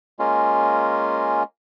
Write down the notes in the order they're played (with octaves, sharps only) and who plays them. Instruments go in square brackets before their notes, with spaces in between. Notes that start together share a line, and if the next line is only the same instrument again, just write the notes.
[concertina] G#3 A#3 C#4 F4